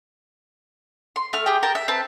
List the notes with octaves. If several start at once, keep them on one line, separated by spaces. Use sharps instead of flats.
C6
A3 F6
G4 G#4 G5
A#4 G5 A5
E5
C4 B4 A5